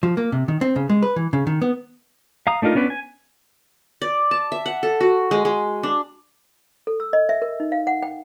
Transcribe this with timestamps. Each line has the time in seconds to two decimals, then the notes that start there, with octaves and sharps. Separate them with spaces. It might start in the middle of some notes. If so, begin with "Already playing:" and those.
0.03 F3
0.17 A#3
0.32 C3
0.48 D#3
0.61 C4
0.76 C#3
0.89 G#3
1.03 B4
1.16 E3
1.33 C#3
1.47 D#3
1.62 B3
2.47 F5 A#5 D#6
2.62 A3 D4 D#4 F4 A#4
2.75 B3 C#4 D4 B4
2.90 G#5
4.02 D5
4.31 A5
4.52 E5
4.66 F#5
4.83 A4
5.01 F#4
5.31 G#3
5.45 G#3
5.83 D4
6.87 A4
7.00 E6
7.13 D#5
7.29 E5
7.42 A#4
7.60 D#4
7.72 F5
7.87 F#5
8.03 G5